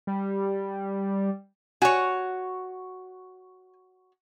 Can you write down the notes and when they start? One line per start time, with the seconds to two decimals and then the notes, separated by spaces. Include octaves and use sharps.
0.07 G3
1.82 F#4 C#5 G#5